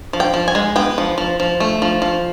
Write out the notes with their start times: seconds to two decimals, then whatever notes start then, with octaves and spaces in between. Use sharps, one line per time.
0.13 F3
0.20 G5
0.34 F3
0.48 G#5
0.55 G#3
0.76 B3 G5
0.98 F3
1.18 F3
1.40 F3
1.60 A3
1.82 F3
2.02 F3